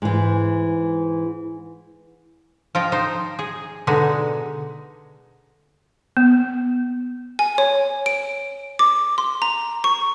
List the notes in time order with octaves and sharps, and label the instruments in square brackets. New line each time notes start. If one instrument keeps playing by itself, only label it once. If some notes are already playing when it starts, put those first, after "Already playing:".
[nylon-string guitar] G#2 E3
[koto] F3 F4 D#5 G5
D#4 C5
G#4
B2 D3 G#3 D#4
[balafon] B3
[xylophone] G#5
C#5
D7
D6
C6
A#5
C#6